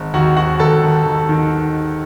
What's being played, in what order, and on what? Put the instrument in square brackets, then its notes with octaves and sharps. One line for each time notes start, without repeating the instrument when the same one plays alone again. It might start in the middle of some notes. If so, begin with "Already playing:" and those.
Already playing: [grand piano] G#1
D#2 F#4 F#5
D#2 F#4 F#5
D#2 A4 A5
D#2
D#2
D#3